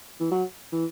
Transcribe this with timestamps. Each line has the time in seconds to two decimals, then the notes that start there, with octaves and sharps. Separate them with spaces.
0.20 E3
0.31 F#3
0.73 E3